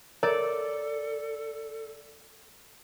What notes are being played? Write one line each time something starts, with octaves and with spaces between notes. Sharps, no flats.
A4 A#4 C#5 D5 A#5